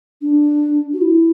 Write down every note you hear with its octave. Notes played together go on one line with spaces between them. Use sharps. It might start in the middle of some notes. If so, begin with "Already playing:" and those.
D4
F#4
E4